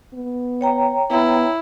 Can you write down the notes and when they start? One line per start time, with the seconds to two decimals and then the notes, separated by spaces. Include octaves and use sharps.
0.14 B3
0.61 C#5 G5 A#5
1.11 B3 E4